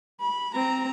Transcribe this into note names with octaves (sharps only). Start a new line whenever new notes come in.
B5
C4 A#5